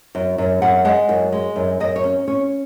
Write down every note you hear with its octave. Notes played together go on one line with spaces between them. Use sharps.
F#2
F#2
F#2 F#5
G#3 F#5
F#2
G#3
F#2
F#2 D#5
C#5
C#4
C#4 C#5